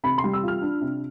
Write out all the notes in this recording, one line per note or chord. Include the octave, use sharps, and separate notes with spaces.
C3 B5
C6
G3
E6
F4
F6
D4
C3